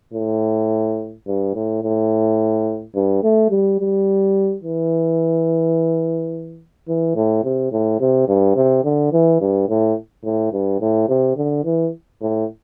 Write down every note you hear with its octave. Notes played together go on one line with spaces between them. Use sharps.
A2
G2
A2
A2
G2
A3
G3
G3
E3
E3
A2
C3
A2
C3
G2
C3
D3
E3
G2
A2
A2
G2
A2
C3
D3
E3
A2